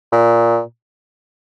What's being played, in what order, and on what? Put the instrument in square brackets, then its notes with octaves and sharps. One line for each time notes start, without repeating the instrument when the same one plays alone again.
[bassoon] A#2